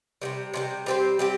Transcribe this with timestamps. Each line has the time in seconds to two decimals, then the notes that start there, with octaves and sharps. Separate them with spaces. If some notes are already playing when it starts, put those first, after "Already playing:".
0.21 C3 D#3 G3
0.54 C3 D#3 G3
0.86 G3 C4 G4 C5
1.19 G3 C4 G4